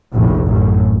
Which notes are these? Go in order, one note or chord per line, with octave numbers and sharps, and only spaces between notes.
F1 A#1 A2
A1 F#2